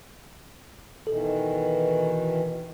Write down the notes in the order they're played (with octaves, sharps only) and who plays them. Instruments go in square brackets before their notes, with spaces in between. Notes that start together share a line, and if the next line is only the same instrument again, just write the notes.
[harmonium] B2 D#3 E3 [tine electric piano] A4